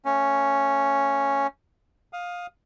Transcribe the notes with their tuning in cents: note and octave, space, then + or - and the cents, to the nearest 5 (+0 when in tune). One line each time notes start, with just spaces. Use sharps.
A3 +30 C#4 +0
F5 +20 D#6 +0